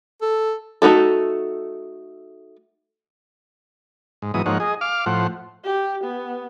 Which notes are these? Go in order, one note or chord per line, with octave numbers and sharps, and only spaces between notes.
A4
A3 D#4 F#4 A4
G#2
G#2 E3 F#3 B3 D#6
G#2 F3 A#3 D#4 C#5 F#5
G#4 D#5
F5 D6 F6
A2 F3 C5 F#5
G4
B3